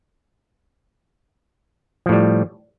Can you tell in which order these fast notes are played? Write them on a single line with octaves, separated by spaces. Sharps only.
F3 A2 G3